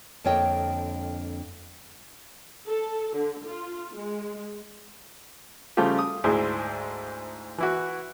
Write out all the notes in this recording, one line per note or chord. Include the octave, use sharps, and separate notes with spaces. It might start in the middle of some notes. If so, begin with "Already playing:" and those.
F2 D3 A#3 C#5 D#5 G5
A4
D3
F4
G#3
C#3 F3 G3 A3 F4 G4
D#6
D2 G#2 E4 G#4 C5 D5
E3 E4 F#4